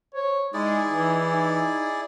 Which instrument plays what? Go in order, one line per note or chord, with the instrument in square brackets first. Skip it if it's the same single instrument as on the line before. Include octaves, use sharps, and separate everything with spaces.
[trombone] C5 [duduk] C#5
[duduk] G#3 [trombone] D#4 [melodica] E4 G#4 D5
[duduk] E3
[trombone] D#4